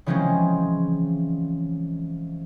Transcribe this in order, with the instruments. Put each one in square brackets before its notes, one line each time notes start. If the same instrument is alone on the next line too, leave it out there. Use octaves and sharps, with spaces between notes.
[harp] C#3 E3 F3 G#3 C4 C#4